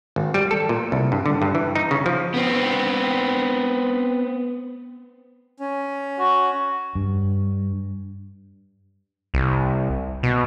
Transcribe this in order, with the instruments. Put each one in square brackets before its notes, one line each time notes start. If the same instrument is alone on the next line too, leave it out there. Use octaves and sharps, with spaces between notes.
[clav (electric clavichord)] G#1
G3
A4
A#2
C2
G2
D3
G2
E3
D#4
C#3
F3
[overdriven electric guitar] B3 C4
[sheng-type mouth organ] C#4
[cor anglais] F#4
[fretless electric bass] G2
[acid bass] C2
B2